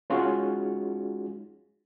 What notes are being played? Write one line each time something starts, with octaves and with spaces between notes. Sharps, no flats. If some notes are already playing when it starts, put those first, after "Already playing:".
G#3 C#4 D#4 F4 F#4 G#4